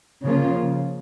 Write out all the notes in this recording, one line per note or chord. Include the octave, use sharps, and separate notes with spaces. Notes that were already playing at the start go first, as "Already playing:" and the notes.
C#3 F3 A#3 F4